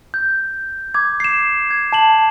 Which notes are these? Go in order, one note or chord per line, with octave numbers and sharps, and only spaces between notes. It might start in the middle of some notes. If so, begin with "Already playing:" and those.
G6
D6 G#6
C7 E7
G#6
A5 E7 F#7